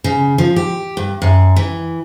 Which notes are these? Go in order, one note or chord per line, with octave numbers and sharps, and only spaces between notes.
C#3
F3
G4
G2
F#2
E3